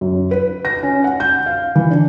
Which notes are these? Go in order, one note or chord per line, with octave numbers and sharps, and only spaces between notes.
F#2
B4
A#6
C#4
F#5
G6
F5
E3
D4